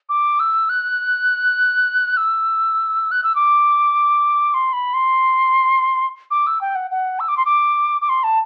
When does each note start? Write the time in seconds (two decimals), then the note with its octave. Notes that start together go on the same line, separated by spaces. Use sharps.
0.09 D6
0.40 E6
0.69 F#6
2.17 E6
3.11 F#6
3.24 E6
3.35 D6
4.54 C6
4.73 B5
4.94 C6
6.31 D6
6.47 E6
6.61 G5
6.75 F#5
6.91 F#5
7.20 E6
7.28 D6
7.37 C6
7.45 D6
8.01 D6
8.09 C6
8.23 A5